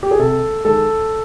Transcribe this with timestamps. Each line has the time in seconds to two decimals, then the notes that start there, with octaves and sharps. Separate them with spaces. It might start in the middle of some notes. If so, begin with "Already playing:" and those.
0.03 G4
0.11 G#4
0.19 C3 A4
0.65 D#3 G#3 A4